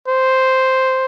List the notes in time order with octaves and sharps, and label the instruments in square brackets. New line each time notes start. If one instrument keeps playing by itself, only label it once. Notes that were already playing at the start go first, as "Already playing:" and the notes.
[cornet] C5